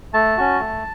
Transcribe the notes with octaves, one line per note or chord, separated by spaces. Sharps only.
A3 A5
C#4 F#4
A3